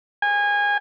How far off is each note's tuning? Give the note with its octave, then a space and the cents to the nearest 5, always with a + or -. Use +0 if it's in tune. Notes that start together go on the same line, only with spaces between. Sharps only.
G#5 -25